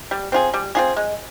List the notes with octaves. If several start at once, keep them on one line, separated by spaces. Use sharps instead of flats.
G3
C4 F4 G#4
G3
C4 F4 G#4
G#3